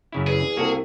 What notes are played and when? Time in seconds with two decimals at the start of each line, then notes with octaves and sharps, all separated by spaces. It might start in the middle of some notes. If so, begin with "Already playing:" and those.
0.12 F#2 C#3 E4
0.27 E2 G#4
0.57 C2 A#3 F#4 A4